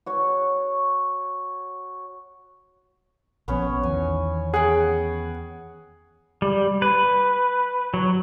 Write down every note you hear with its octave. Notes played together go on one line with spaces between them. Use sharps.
F#4 C#5
A#1 F3 B3 C#4 C#5
E2 D#3 G#5
G#4 F#5 G5
G3
B4
F#3